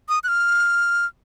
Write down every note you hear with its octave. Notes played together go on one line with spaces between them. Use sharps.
D#6
F#6
F6